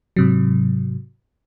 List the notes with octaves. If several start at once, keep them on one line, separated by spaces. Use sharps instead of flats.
G#2 C3 F#3